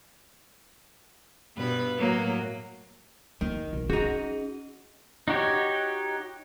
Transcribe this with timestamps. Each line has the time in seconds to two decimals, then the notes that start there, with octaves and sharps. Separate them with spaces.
1.57 G2 B2 B4
1.98 A2 F#3 A#3
3.41 D#2 D#3 A#3
3.73 B1
3.90 C#4 D#4 F#4 G#4
5.28 D#4 F#4 G4 C#5